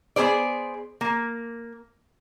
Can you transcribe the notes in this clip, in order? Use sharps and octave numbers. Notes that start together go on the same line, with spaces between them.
B3 G#4 C5 D5
A#3